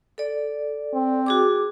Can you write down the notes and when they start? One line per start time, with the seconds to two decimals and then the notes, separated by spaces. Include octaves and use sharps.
0.18 A4 D5
0.94 C4
1.26 F#4 G#4 D6